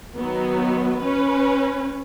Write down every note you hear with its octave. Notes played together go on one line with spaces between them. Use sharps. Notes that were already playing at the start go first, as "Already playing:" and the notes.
D#3 F#3 B3
C#4 B4